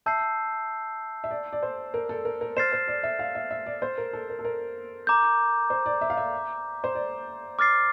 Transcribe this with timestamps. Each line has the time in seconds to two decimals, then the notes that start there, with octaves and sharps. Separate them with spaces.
0.06 E5 A5 E6 G6 C7
1.24 E5
1.31 D5
1.53 D5
1.63 C5
1.94 A#4
2.09 A4
2.25 A#4
2.41 A#4
2.57 C5 F6 A6 C7 E7
2.72 C5
2.88 D5
3.03 E5
3.19 F5
3.35 E5
3.51 E5
3.66 D5
3.82 C5
3.98 A#4
4.13 A4
4.29 A#4
4.39 A4
4.45 A#4
5.07 A#5 D6 G6
5.70 C5
5.86 D5
6.01 E5
6.10 F5
6.17 E5
6.84 C5
6.95 D5
7.59 D6 F6 A6 C7